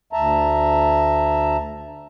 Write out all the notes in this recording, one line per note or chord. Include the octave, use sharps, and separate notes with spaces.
D2 E5 A5 A#5